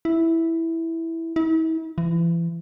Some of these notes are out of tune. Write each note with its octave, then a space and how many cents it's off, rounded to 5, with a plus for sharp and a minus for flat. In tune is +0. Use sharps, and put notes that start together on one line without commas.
E4 -5
E4 -40
E3 +35